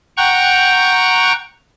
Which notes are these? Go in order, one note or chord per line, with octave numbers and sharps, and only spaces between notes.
F#5 G5 A#5 C#6 F#6 G6